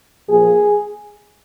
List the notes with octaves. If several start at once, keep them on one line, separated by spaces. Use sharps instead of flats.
A#2 F3 A#3 G#4